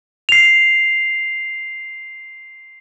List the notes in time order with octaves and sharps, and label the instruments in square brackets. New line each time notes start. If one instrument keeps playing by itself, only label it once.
[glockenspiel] C7 F7